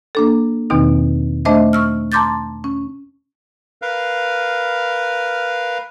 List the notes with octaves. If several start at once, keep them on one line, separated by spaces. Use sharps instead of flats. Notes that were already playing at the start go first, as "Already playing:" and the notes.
A#3 D4 A4
E2 B2 D#3 C4 D#4
A3 D4 C5 D#5 E5
C#6 E6 F6
A5 A#5 C6 D6 G6 A6
C#4
A#4 B4 F5